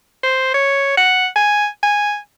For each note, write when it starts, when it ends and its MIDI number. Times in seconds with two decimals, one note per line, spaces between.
0.24 0.51 72
0.54 0.94 73
0.97 1.27 78
1.36 1.67 80
1.83 2.17 80